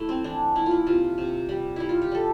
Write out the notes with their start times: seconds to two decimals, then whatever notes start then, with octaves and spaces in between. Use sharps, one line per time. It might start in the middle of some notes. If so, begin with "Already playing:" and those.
Already playing: A3 E4
0.09 C4
0.24 E3 D4
0.55 A#3 E4
0.66 F4
0.71 E4
0.87 C3 F4
1.18 C3
1.49 G3
1.76 G3 E4
1.89 F4
2.02 G4
2.12 G3 A4